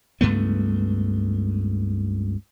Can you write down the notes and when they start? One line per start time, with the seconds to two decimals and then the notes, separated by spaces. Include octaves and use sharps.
0.21 C#2 G2 A3 B3